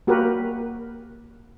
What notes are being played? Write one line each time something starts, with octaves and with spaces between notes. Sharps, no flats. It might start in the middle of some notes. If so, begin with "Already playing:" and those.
A#3 F#4 G4 A#4 B4